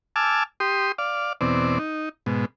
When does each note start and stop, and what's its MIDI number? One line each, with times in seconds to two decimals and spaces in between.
0.16 0.43 80
0.16 0.43 81
0.16 0.43 86
0.16 0.43 88
0.16 0.43 89
0.60 0.92 67
0.60 0.92 84
0.60 0.92 87
0.98 1.33 74
0.98 1.33 77
1.41 1.79 40
1.41 1.79 47
1.41 1.79 60
1.41 1.79 74
1.79 2.09 63
2.26 2.45 44
2.26 2.45 47